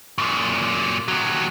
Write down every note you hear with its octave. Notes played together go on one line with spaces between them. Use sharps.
F#2 A#2
D#2 F#3